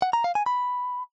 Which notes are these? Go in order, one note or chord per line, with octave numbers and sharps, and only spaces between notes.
F#5
A#5
F5
G#5
B5